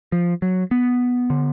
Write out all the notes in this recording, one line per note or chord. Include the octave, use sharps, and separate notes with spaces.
F3
F#3
B3
D3